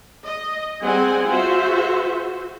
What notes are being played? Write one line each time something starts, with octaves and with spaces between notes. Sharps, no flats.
D#5
G3 C4 G#4 F#5 G#5
F4 F#4 G#4 C5 E5